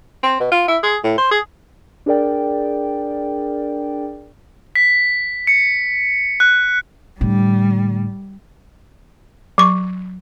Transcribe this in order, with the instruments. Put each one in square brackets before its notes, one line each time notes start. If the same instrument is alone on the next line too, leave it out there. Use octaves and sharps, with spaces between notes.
[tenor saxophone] C4
B2
F4
E4
G#4
A2
C5
G#4
[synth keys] D4 G#4 A#4 D5 G5
[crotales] B6
C#7
F#6
[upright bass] A2 D3 [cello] G3
[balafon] F#3 C#6